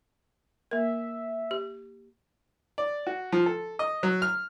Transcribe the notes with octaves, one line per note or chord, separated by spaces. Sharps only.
A#3 A#4 E5
G4
D5
F#4
F3
A4
D#5
F#3
F6